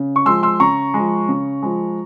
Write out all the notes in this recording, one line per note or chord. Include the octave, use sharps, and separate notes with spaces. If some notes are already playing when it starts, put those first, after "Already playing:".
Already playing: C#3
C#6
F3 G#3 C6 E6
C6 E6
C#3 A#5 C#6
F3 G#3
C#3
F3 G#3